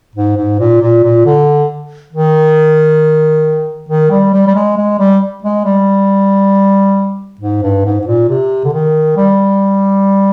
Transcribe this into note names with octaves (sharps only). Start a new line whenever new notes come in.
G#2
G#2
A#2
A#2
A#2
D3
D#3
D#3
G3
G3
G3
G#3
G#3
G3
G#3
G3
G#2
G2
G#2
G#2
A#2
C3
D3
D#3
G3